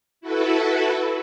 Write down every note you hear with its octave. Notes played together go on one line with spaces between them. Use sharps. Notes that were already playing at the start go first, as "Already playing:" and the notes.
E4 F#4 A4 B4